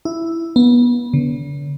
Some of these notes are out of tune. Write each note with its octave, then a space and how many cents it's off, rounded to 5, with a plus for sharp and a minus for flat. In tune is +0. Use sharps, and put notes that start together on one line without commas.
E4 +5
B3 -25
D3 -45